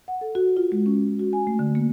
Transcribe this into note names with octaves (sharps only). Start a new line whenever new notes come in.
F#5
A4
F#4
F4
G#3
C#4
F#4
G#5
A3
D3
A#3